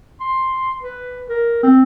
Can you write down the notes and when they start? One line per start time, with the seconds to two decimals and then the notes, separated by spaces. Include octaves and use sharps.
0.20 C6
0.82 B4
1.29 A#4
1.63 C4